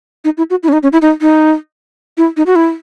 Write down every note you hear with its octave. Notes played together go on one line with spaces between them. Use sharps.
D#4
E4
F#4
E4
C#4
D#4
C#4
E4
D#4
D#4
E4
D#4
F#4
E4